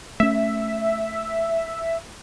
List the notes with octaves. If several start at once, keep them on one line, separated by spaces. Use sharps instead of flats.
A3 C#4 E5